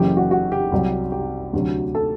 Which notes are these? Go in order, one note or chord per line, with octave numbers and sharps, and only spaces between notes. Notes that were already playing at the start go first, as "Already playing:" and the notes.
Already playing: F#1 F#2 E3 G4
F#4
F#4
G4
C2 C3 F#3
G4
D2 C3 F#3
A4